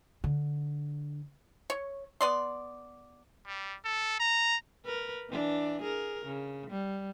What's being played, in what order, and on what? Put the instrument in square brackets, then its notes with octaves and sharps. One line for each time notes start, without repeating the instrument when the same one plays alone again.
[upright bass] D3
[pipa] C#5
B3 D5 C6
[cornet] G3
A4
A#5
[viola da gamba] A#4 B4
E3 D4
G#4 A#4
C#3
G3